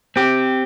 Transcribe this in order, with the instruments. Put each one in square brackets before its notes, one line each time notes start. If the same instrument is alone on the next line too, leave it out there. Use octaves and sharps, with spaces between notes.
[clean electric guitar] C4 G4